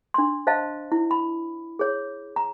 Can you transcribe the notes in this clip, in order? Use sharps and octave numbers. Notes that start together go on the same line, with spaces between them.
D4 C6
C5 D#5 F5 A5
E4
B5
G#4 C#5
A#5